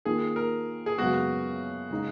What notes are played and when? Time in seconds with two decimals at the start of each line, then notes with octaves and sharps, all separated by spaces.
0.05 D#3 A#3 F4 G#4
0.36 A#4
0.86 G#4
0.98 F#2 C#3 G#3 B3 F#4
1.90 C#3 G#3 D#4